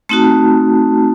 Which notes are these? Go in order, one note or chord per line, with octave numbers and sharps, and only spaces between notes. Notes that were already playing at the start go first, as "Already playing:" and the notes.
A3 C4 D#4 F#4 A5